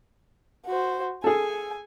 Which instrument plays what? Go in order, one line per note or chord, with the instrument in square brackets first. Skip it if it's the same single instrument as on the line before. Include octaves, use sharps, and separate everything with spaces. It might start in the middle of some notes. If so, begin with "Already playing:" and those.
[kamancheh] F#4 C5
[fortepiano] G#4 A4 [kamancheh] G#5